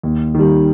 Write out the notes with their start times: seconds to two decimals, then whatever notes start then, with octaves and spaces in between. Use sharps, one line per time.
0.03 D#2
0.35 D#3 G3